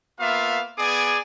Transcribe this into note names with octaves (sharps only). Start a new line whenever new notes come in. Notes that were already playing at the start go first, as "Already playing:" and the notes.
A#3 B3 F4 E5 F5
B3 G#4 D5 G#5 D6